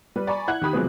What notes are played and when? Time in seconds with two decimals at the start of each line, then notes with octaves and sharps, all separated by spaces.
0.16 G3 B4
0.27 D5 G#5 A#5 B5 C#6
0.48 E4 F#5 F#6 G#6
0.62 D#3 G4 B5 D#6
0.73 C3 F3 F#3 G#3 B3 C4